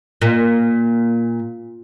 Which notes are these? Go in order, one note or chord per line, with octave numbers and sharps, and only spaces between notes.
A#2